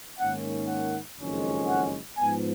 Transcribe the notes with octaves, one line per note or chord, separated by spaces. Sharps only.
G#2 D#3 A#3 C#4 F#5
F#5
F#1 F2 D#3 G#3 C#4
F#5
G#2 F3 B3 G#5